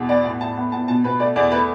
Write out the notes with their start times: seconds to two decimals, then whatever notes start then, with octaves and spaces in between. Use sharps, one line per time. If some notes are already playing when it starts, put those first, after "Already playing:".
Already playing: E2 B2
0.09 B3 D5
0.25 A2
0.41 A2 A5
0.57 B3
0.72 B3 A5
0.88 B2 A5
1.04 B2 B4
1.19 A3 D5
1.36 E2 D5
1.52 A3 B4